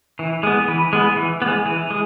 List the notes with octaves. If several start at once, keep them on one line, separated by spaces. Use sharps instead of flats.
E3
G#3 B3
E3
G#3 B3
E3
B3
G#3
E3
G#3